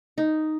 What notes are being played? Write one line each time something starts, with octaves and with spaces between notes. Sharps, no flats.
D#4